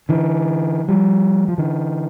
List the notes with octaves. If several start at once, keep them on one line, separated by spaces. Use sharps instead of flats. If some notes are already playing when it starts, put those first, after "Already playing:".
D3 E3
F3 G3
F3
D3 E3